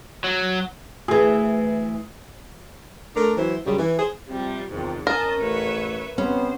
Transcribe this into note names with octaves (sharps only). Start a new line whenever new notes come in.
F#3
D2 E3 G#4
A3 D4 A#4
E3 F#3 E4 C5
F#2 C#3 G3
E3
G#4 C5
C3 F3 G3
E2 G#2 C3 D#3 F3 C4
C#4 A#4 D#5 A5
A1 A2 B4 C#5 E5
C3 B3 C#4 C5